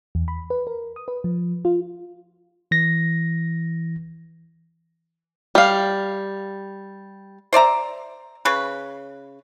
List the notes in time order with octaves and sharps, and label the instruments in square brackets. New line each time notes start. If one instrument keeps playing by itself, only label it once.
[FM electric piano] E2
B5
B4
A#4
D#6
B4
F3
F4
[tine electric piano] E3 A#6
[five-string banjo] G3 F5
[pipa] C5 D5 E5 A#5
C#3 B4